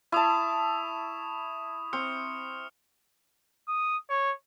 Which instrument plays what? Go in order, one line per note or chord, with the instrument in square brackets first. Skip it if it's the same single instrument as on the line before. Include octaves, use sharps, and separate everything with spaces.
[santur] E4 A5 [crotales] C#6 D#6 E7
[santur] C4 [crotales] D#6 F6 C#7
[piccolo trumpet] D#6
C#5